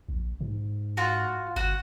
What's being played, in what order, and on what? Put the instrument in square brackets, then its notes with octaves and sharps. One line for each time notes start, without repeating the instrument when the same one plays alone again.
[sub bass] A#1
G#2
[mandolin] F4 F#4
[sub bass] G1 [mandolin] F#4